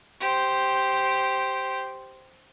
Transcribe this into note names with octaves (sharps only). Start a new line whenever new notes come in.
G4 C5